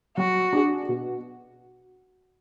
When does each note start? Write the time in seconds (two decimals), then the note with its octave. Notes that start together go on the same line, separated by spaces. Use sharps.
0.17 F#3 F#4
0.53 D4 G#4
0.88 B2